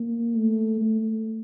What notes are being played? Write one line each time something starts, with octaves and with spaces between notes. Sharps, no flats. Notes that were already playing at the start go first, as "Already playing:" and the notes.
Already playing: A#3
A3
A3